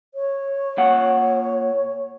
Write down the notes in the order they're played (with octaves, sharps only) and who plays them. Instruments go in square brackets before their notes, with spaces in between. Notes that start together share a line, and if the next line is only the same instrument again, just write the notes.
[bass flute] C#5
[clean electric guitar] A#2 F#5